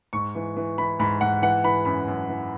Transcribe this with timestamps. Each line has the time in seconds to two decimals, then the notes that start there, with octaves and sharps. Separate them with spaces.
0.13 G#2 C#6
0.35 E3
0.56 E3
0.78 E3 B5
1.00 G#2 B5
1.21 G#2 F#5
1.42 E3 F#5
1.64 E3 B5
1.85 F#2 B5
2.08 F#2
2.29 E3